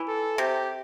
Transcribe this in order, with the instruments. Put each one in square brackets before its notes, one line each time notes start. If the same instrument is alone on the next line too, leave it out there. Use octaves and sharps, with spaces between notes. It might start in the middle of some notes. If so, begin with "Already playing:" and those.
Already playing: [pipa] E3
[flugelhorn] A4
[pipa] C3 [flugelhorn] G4